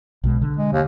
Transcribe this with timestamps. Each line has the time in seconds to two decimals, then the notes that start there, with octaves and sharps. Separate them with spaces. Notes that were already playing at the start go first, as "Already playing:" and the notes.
0.24 B1 B2 G#3
0.42 D3
0.57 G#3
0.73 D#2